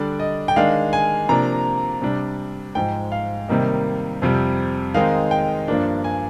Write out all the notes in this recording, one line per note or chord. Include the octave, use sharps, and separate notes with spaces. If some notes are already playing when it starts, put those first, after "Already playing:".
Already playing: D3 G3 D4 D5
D#5
G5
D#3 G#3 D4 F5
G#5
C3 F3 A#3 D4 A#5
C3 G3 D4
G#2 F3 G#3 G5
F5
C3 D#3 G3 A#3 D#4
F2 C3 G3
D#3 G#3 C4 D#4 F5
G5
G2 F3 A#3 D4
G#5